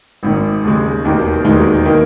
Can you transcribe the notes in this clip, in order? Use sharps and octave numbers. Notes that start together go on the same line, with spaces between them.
G#1 G#2 D#3
D#2 C#3 G#3
E1 D#2 D#3 A#3
E1 D#2 D#3 G#3 D#4
D#3 A#3 D#4